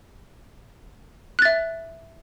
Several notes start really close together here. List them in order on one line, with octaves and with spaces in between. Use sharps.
F#6 A6 E5